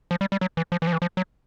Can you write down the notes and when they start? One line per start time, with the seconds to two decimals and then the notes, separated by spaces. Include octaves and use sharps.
0.11 F3
0.21 G3
0.32 G3
0.41 F#3
0.57 E3
0.72 F3
0.82 E3
0.87 F3
0.92 E3
1.02 F3
1.17 F#3